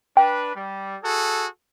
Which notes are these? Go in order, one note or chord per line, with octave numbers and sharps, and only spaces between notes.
D4 B4 G5
G3
F#4 G#4 A4